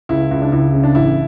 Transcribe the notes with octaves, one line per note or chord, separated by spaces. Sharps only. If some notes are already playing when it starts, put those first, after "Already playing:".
C#2 E4
C#2
D4
C#2 E4
C#3
D4
A1 E4